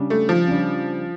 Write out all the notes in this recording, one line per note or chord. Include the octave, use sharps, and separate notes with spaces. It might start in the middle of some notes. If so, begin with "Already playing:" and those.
Already playing: C#3 G3 D4
A3
F3
C#3 G3 D4